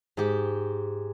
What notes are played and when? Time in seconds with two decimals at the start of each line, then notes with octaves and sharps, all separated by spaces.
0.17 G#2 G4